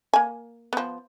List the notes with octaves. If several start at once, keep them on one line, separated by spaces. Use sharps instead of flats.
A#3 G#5
F3 B3